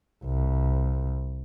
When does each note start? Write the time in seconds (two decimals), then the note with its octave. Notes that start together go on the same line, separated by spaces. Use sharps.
0.25 C2